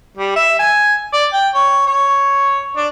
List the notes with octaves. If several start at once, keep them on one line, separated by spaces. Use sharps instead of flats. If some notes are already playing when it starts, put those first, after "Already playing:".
G3
E5
G#5
D5
G5
C#5
C#5
D4